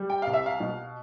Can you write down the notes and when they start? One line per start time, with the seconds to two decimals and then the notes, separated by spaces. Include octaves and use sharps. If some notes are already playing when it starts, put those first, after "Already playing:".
Already playing: G3
0.10 G5
0.22 C2 F5
0.33 E5
0.46 F5
0.60 B2